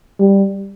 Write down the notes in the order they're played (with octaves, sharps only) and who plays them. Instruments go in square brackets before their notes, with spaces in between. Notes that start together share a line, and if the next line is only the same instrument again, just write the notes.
[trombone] G3